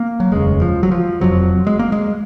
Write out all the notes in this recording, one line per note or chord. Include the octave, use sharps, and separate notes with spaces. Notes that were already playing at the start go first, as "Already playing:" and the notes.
Already playing: A#3
F#3
F1 D#2 C#3 G#3
F3
F#3
F3
F1 F2 C3 F#3
G#3
A#3
G#3